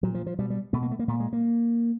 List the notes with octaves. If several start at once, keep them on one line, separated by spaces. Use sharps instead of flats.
A#2 F#3
F3
F3
B2 G3
G3
B2 A3
A#3
A3
A#3
A#2 A3
G#3
A#3